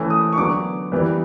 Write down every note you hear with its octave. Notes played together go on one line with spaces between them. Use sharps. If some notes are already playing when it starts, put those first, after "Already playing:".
Already playing: E3 A3 C#4
D#6
C#6
D3 F#3 B3 D6
E3 G3 B3